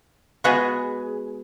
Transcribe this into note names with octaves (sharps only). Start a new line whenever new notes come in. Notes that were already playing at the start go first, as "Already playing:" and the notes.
G#3 B3 F#4 G#4